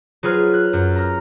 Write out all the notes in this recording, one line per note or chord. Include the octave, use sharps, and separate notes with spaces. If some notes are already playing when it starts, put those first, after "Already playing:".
F#3 F4 G#4 B4 B5 F6
F6 F#6
F#2
A#5 F6